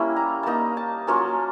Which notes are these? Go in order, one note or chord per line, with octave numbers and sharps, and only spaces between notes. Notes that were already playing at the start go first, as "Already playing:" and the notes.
Already playing: G3 A#3 C#4 E4
A#5
A#3 D#4 A5 A#5
A5
F#3 A#3 C#4 F4 A5